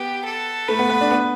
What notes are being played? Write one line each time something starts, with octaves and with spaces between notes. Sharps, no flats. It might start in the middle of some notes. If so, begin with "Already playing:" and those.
Already playing: B3 G4
A4
A3 B4
B3
B3
D4
B3